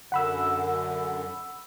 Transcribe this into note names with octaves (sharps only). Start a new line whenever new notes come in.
F#2 D3 F#5 B5 E6